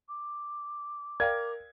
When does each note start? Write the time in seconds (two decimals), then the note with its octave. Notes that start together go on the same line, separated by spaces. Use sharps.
0.09 D6
1.20 A#4 D5 F5 G5 G#6